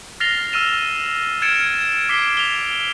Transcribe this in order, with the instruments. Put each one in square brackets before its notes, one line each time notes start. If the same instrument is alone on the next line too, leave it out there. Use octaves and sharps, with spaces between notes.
[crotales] F6 A6 A#6 C7 F7 G7
E6 F6 D#7 E7
F6 G#6 A6 C#7 D7 E7
D6 B6 C7 D7 G7
F7 G7